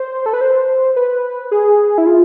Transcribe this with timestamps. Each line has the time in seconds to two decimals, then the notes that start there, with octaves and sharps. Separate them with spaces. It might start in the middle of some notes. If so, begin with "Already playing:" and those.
Already playing: C5
0.26 A4
0.33 B4
0.41 C5
0.96 B4
1.51 G#4
1.98 E4
2.07 F4